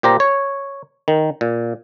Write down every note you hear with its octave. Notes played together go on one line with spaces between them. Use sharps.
A#2 G4 C5 A#5
C#5
D#3
A#2